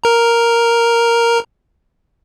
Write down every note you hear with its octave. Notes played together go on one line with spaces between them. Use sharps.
A#4 A#5